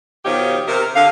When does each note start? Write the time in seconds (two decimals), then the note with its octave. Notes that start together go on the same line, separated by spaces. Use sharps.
0.25 B2 D#3 F3 D#4 G4 C#5
0.66 C3 A#4
0.95 D3 F5